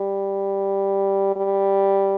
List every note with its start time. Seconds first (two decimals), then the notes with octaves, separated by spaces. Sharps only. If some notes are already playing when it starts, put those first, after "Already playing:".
Already playing: G3
1.36 G3